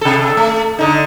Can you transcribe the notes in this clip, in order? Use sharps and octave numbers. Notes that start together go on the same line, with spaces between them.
C3 A4
A3
D3 D#4